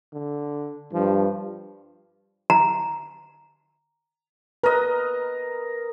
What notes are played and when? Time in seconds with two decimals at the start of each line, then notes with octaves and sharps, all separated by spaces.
0.13 D3
0.93 G2 F3
2.50 A#5
4.63 A#4 B4 D#5